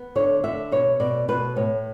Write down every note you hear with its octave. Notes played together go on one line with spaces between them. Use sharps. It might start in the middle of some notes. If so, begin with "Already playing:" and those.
Already playing: B3
D3 C#5
D3 E5
B2 C#5
B2 D5
B2 B4
A2 C#5